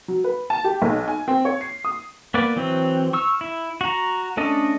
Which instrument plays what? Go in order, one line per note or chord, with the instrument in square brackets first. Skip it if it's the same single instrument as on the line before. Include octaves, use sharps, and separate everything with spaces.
[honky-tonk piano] F#3
B4
A5
G4
B1
G#5
C4
C#5
C7
D#6
[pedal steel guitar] A#3 B3 B4 D5
E3 F#3 C4
C#6 E6 F6
E4
F#4 A#5
A3 C#4 D4 A4 D#5